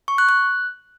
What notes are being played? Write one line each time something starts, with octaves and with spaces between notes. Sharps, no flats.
C#6
F#6
F#6